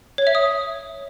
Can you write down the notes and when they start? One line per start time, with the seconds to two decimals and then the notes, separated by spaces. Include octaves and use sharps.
0.18 C#5
0.27 E5
0.35 D#6